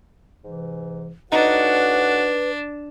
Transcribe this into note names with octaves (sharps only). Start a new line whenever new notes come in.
G#2 C3 E3
A2 D4 D#4 F#4 B4 F#5